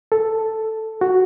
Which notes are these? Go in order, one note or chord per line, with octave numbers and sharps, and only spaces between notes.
A4
F#4